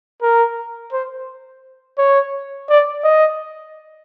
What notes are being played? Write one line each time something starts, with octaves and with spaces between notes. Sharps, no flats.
A#4
C5
C#5
D5
D#5